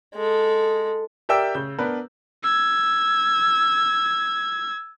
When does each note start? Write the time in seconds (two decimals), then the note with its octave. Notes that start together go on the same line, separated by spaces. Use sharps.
0.15 G#3 A4
1.29 G4 A#4 D5 E5 G5 E6
1.54 C#3 G6
1.79 B3 D4 A#4 B4
2.43 E6 G#6